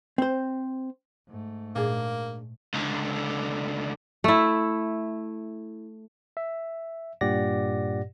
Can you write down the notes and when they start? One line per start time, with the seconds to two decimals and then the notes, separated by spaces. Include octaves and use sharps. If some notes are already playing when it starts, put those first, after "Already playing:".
0.18 C4 C5
1.28 G#2 A3
1.76 A#2 A#3 D4 G#4
2.74 C#2 D3
4.24 A3 E4
6.37 E5
7.21 G2 A#2 G4 D5 F#5 A#6